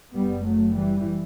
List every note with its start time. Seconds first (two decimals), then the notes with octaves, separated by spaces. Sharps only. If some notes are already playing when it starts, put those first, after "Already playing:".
0.14 F#1 F#2 G3 B3
0.45 F#3 A3
0.74 E3 G3